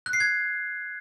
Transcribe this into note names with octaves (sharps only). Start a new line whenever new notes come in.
F#6
C7
G#6